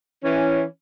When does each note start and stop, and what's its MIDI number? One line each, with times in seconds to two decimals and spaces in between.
0.24 0.62 52
0.24 0.62 61